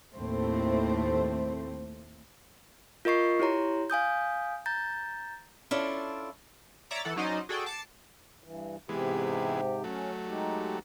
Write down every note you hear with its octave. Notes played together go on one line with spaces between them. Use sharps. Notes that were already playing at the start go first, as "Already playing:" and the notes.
D#2 A2 A3 C4 C5
F4 A#4 D#5 C#6 C7
E4 G4 C#5 A#5 C6
F5 G#5 D#6 G6
A#5 G6 A6
C#4 D4 E4 F4 A4 D5
C#5 D5 E5 A#5 D6
E3 A4 F#5
F#3 C#4 D#4 C5 D5 D#5
F#4 G#4 A4 D5 G5
A5 D6 A6 C7 C#7
G2 E3
G#2 C3 E3 G#3 B3 G4
F#3 A3 C#4
G#3 D#4 G4